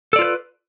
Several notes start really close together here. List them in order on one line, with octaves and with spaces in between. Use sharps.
A4 D5 F4 C5 B4